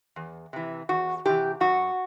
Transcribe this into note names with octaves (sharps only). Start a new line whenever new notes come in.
E2
C3 E3
E2 F#4
C3 E3 G4
F#2 F#4